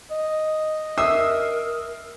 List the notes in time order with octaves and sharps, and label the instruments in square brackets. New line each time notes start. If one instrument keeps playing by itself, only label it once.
[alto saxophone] D#5
[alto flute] A#4 [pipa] E5 [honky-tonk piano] D#6 E6 C7